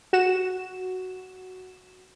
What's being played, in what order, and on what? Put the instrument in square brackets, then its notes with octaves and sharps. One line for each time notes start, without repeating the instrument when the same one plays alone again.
[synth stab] F#4 E7